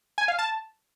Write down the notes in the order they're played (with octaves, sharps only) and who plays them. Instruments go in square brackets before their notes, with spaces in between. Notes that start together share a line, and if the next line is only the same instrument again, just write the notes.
[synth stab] G#5
F5
A5